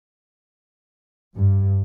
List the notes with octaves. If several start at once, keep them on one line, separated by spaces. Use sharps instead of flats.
G2